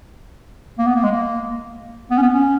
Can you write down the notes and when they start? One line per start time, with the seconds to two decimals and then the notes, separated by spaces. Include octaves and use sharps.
0.79 A#3
0.87 B3
0.96 A#3
1.04 G#3
1.11 A#3
2.10 B3
2.18 C#4
2.22 B3
2.33 C#4